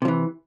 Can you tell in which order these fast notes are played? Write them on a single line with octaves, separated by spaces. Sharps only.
C3 F3 E3